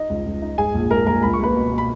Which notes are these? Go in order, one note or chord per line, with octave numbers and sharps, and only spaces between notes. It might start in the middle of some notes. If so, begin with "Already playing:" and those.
Already playing: D#4 D#5
C#2
C#2
D#4
G#2 G#4 G#5
A#1
G#2 A#4 A#5
A#1 A#4 A#5
C#2 B5
C#6
A#3 B4 B5
B2
B2
B5